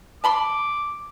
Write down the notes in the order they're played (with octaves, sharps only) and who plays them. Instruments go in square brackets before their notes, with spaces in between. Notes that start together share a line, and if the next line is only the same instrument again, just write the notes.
[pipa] A5 B5 C6 [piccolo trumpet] D6